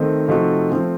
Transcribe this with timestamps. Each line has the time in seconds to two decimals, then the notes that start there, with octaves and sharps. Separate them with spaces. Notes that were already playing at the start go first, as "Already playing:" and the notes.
Already playing: D#3 A3 C4 D#4
0.28 C3 F3 A3 D#4 F#4
0.71 F3 A3 C4